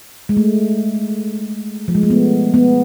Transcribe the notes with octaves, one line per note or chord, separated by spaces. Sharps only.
G#3
A3
F3
G#3
A3
B3
B3